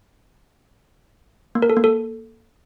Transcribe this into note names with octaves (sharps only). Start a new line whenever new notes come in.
A#3
A#4
A4
A#3
A4